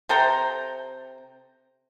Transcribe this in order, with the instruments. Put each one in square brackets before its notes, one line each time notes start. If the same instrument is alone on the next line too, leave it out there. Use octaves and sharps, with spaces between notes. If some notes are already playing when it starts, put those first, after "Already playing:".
[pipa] C3 A4 G5 A#5